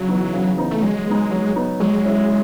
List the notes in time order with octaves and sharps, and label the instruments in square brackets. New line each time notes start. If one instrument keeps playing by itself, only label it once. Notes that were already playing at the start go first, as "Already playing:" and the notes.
Already playing: [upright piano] C#3 [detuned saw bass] F#3
[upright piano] E3 B3 D#4
C#3
E3 B3 D#4
[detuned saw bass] A3
[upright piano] F#3 [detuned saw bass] G#3
[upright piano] B3 D#4
F#3
B3 D#4
[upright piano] F#3 [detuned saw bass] G#3
[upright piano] C#4 E4